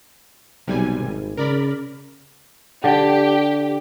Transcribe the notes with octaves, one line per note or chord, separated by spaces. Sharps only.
B1 C3 G3 G#5
G#1
C#3 A#4 D5 B5
D3 G4